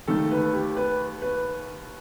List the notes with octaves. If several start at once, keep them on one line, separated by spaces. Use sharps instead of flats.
D#2 D#3 A3 A4
B4
G4
B4
B4